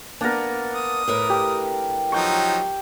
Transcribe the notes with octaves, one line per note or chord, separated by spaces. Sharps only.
A#3 B3 D4 A#4
D#6
A2 A#4 B4
G4
F3 F#3 D#4 G5 C#6